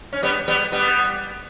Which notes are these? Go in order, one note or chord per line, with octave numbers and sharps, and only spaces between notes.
C#4
G3 B3
G3 B3
G3 B3